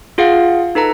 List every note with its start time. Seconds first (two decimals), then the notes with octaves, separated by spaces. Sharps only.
0.18 F4 G#4 F5 F#5
0.75 D#4 A4 B4 A#5